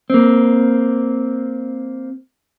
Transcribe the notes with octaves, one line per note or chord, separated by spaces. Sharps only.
A#3 C4